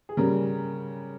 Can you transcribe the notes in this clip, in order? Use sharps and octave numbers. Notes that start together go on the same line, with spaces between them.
G#4
C#3 G3 A#4